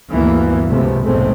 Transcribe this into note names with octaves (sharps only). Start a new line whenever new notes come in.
D2 G2 E3 A#3 B3
C#2 C3 F3 G#3 A3 B3
F1 B1 G#2 G#3 A3 C4